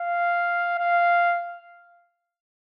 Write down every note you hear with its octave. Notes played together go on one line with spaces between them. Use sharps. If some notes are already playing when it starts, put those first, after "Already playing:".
Already playing: F5
F5